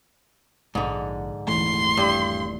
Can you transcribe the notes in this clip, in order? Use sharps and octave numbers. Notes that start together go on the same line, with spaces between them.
A#1 G#2 D3
D#1 E3 A3 C6
G2